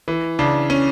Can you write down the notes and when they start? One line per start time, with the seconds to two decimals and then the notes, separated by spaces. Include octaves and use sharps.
0.08 E3
0.39 C#3 D4
0.70 C#4